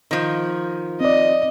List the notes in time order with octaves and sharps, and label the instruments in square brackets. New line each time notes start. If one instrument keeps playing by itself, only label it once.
[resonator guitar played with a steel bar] D#3 F3
[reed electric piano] C4 D5 [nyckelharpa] D#5